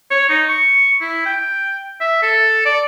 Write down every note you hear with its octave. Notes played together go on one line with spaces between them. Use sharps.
C#5
D#4
C#6
E4
G5
E5
A4
D5